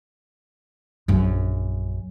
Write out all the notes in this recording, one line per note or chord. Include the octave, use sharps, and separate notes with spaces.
A#1 F#2